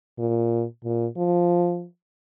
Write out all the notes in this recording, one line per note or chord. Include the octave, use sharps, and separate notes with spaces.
A#2
A#2
F3